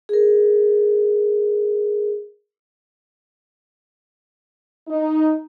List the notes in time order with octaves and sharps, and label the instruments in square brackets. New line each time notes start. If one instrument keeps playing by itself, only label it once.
[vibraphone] G#4 A#4
[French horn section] D#4